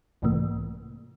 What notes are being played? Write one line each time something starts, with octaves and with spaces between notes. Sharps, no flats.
B1 G#2 C3 E3 A3 A#3